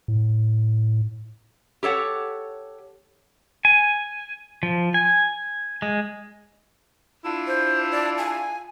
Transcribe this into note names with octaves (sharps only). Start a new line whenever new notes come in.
A2
G4 A4 C#5 F#5
G#5
F3
G#5
G#3
D4 E4 F4
C5
D5
G#5